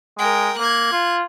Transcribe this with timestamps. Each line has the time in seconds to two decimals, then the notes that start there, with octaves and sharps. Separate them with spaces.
0.19 G#3 A#4 G5
0.59 A#3 F#6 G#6
0.92 F4